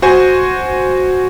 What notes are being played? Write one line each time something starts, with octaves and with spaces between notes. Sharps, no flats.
F#4 C5 G#5